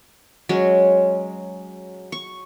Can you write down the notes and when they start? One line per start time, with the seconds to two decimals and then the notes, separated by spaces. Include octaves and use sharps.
0.49 F#3 G#3 C#4
2.12 C#6